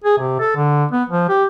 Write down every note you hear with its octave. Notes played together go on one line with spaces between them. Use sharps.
G#4
C3
A4
D3
B3
F3
G4